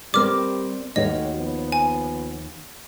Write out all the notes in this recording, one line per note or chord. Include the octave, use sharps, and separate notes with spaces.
G3 C4 A#4 D5 D6 F6
D#2 A3 F#4 C#5 D#5 F5
F3 B3
G#5